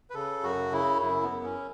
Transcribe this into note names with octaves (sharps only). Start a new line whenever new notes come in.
B4
C#3 A4
F#2 F#4
C#3 E4
F#2 E4
B3
F#2
C#4